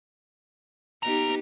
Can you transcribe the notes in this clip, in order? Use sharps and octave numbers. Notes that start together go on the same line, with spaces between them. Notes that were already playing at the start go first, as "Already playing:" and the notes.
B3 D#4 G4 B4 A#5